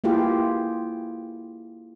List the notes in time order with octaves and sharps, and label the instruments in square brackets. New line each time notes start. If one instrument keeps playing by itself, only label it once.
[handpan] A#3 E4 F4 G4 G#4